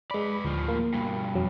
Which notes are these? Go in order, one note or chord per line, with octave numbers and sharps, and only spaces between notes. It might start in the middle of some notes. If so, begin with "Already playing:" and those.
G#3 B4 D5 B5
D2 A2 F3
A#3
G2 B2
F2 F#3